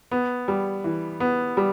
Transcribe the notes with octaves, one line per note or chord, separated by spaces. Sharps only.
B3
G3
E3
B3
G3